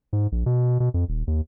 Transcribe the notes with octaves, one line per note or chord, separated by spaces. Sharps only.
G#2
A#1
B2
B2
F2
D#1
D#2